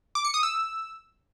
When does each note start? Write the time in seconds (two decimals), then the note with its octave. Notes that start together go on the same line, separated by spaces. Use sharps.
0.15 D6
0.25 C#7
0.34 D#6
0.43 E6